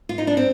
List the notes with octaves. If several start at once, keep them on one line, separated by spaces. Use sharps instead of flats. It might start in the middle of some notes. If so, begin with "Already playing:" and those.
F4
D#4
D4
C4